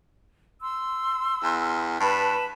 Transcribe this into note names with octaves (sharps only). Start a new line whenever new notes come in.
C6 E6
E2
G2 B4 A5 B5